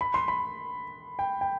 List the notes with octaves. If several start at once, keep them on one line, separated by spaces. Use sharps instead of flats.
B5
C6
B5
G5
G5